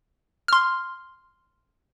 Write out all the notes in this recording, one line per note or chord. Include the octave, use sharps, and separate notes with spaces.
C6 F6